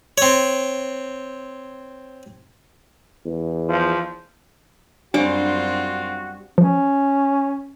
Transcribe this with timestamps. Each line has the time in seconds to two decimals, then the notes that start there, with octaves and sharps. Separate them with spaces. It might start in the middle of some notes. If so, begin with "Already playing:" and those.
0.18 C4 C#5
3.26 E2
3.69 F3
5.14 F#2 G3 C4 D4 F4 F#4 D6
6.58 F3 C#4